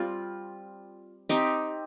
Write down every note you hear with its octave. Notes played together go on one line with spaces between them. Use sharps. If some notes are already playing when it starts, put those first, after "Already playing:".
Already playing: G3 C4 F4
C4 D#4 G4